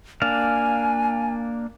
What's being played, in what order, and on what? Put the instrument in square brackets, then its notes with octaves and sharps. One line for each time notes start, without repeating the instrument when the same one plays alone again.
[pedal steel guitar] A#3 D4 F5 [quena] G#5